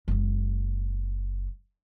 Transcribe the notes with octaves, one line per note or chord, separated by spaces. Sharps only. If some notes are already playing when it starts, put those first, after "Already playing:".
F#1 G#3